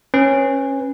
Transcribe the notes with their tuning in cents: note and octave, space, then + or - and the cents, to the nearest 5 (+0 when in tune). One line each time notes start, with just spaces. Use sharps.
C#4 -20 B4 +0